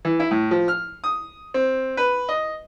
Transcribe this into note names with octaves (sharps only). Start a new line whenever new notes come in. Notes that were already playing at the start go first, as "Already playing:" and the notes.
E3
E4
A2
F3
F6
D#6
C4
B4
D#5